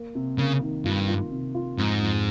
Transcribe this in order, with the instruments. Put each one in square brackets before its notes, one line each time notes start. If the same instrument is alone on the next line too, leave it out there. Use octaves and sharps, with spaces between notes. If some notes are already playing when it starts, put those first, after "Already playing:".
Already playing: [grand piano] A#3
C3
[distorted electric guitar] C#3 [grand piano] A#3
[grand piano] D#3
[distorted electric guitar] G2 [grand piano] F4
[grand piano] F4
C3
F4
[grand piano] F2 [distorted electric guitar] G#2
[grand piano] F2